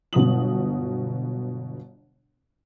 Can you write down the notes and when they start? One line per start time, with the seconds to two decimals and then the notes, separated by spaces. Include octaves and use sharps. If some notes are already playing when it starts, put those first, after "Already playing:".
0.13 G1 B2 F#3 D#6 F#7